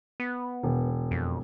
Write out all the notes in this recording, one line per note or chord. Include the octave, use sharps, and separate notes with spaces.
B3
E1
F2